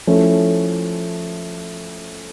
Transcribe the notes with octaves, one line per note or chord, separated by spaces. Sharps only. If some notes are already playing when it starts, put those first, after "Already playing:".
F3 A3 C#4 E4